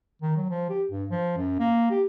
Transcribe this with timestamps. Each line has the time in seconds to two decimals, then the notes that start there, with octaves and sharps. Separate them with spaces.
0.22 D#3
0.37 F#3
0.50 F3
0.70 G4
0.91 G2
1.10 F3
1.37 F#2
1.59 A#3
1.91 G4